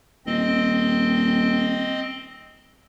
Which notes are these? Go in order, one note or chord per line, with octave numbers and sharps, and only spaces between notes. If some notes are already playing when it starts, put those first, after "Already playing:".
D#1 C4 D#5